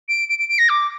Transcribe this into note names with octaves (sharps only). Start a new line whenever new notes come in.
D7
D7
D7
D7
A#6
D6